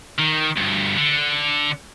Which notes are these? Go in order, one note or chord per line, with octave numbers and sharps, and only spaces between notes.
D#3
D2 G2
D3